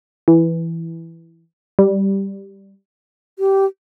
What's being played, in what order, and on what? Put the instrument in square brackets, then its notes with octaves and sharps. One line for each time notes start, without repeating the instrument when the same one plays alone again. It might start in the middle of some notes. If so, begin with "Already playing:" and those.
[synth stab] E3
G3
[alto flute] G4